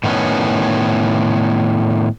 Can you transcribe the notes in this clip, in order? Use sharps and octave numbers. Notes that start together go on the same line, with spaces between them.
A2 D#3 A#3 B3 C#4